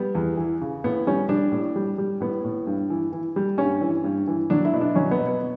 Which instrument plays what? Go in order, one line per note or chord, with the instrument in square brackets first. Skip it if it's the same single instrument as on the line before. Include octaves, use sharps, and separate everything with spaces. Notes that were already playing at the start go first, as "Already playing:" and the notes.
Already playing: [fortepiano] G3 B3
E2
E3
C#3
A2 B3
G3 C#4
G3 D4
A2
G3
G3
A2 B3
A2
G2
E3
E3
G3
G2 C#4
E3
G2
E3
F#3 D4
E4
B2
D4
F#3 C#4
B3
B2
B3